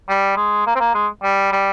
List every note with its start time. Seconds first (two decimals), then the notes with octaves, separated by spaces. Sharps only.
0.09 G3
0.37 G#3
0.67 A#3
0.76 C4
0.80 A#3
0.94 G#3
1.23 G3
1.53 G3